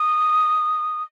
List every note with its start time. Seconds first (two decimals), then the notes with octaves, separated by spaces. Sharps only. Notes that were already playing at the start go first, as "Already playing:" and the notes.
Already playing: D#6